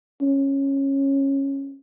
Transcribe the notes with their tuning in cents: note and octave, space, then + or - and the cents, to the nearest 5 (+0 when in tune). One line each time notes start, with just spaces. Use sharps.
C#4 -15